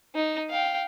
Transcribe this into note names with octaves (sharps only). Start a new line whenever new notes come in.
D#4
F5 G5